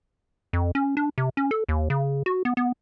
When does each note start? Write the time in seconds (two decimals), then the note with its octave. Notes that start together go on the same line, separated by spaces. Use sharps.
0.53 F2
0.75 C#4
0.97 D4
1.18 C3
1.37 C#4
1.51 A4
1.69 D#2
1.90 C#3
2.26 F#4
2.45 B3
2.57 B3